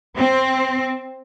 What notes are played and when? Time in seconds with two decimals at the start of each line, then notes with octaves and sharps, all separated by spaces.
0.17 C4